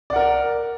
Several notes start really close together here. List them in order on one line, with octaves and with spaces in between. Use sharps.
D5 F#5 A#4